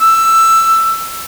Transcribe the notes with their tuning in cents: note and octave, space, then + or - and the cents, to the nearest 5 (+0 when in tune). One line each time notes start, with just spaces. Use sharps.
E6 +10